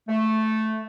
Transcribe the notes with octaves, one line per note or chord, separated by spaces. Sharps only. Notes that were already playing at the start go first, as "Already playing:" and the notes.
A3